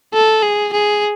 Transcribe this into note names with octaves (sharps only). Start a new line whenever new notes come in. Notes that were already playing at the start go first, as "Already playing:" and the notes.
A4
G#4
G#4